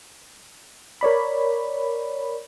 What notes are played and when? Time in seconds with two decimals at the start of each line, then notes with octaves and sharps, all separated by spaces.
1.01 A#4 C#5 D5 B5